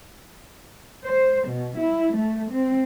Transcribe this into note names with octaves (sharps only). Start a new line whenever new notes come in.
C5
B2
E4
A3
C4